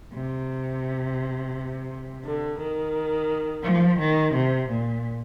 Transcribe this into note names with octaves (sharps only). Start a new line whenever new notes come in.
C3
D3
D#3
F3
D#3
C3
A#2